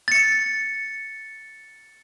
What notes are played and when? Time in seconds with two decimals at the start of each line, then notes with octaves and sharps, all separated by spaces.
0.08 A6 C#7